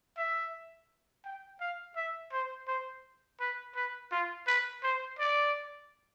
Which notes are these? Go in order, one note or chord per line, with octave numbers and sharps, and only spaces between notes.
E5
G5
F5
E5
C5
C5
B4
B4
F4
B4
C5
D5